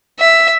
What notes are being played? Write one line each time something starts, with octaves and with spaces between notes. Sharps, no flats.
E5